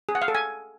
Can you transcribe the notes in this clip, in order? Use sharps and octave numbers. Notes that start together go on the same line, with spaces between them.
G#4
F#5
F5
A4
G#5